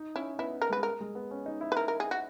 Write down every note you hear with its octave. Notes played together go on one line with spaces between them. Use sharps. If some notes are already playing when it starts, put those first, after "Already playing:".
Already playing: D#4
C#4 E4
B3 E4
A#4
G#3 B4
A#4
G#3
B3
C#4
D#4
E4
B4
A#4
A#4
G#4
F#4